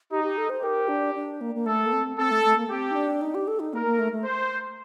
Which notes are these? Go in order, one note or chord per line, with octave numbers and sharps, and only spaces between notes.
D#4 G4
G4
A4
C5
G4 A#4
D4
D4
A#3
A#3
A3 A4
A#3
C4
C4 A4
A3
A3
A#3
C4 G4
D#4
D4
D#4
G4
A4
D#4
A#3 A#4
A#3
A3
A3
C5